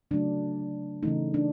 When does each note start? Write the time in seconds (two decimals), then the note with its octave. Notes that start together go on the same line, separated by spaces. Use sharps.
0.11 C#3 F#3 A3 D4
1.03 C#3 E3 A3 D#4
1.34 D4